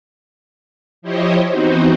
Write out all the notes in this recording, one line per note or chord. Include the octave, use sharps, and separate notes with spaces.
F3 E4 G4 C5 C#5 D#5
E3 B3 C4 D#4 F#4 C5